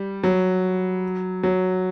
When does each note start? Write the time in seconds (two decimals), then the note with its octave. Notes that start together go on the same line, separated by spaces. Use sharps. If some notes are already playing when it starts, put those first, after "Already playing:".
Already playing: G3
0.24 F#3
1.43 F#3